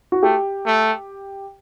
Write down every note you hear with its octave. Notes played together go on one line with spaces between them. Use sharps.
F#4
A3 G4
A3